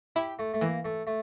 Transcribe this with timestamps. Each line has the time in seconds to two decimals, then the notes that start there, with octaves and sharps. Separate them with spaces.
0.16 E4 G4
0.39 A3
0.54 A3
0.61 E3 A#3
0.85 A3
1.07 A3